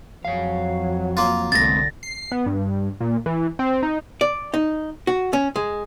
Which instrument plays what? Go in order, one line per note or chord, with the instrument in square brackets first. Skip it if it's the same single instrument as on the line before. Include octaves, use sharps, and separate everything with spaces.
[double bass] F2 F#3 [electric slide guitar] C#5 F5
[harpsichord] A#3 F4
[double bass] C2 D3 [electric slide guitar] G#3 A3 C4 [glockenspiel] A6 A#6
[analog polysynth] C7
B3
G2
A#2
E3
C4
D#4
[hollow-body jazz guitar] D5
D#4
F#4
C#4
G#3